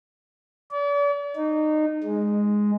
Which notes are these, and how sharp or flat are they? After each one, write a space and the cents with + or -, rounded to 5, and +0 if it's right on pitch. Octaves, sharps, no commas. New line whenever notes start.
D5 -40
D#4 -20
G#3 +0